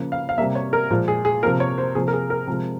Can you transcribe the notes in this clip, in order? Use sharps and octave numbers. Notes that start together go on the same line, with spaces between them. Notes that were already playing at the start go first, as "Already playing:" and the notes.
Already playing: C#3 F3 A#3
F5
F5
C3 G3 A#3 E5
C#5
A#4
A#2 F3 G#3
G#4
G#4
C3 F3 A#3 A#4
C#5
C5
C3 F3 A#3 G#4
A#4
G#4
A#4
C3 F3 G#3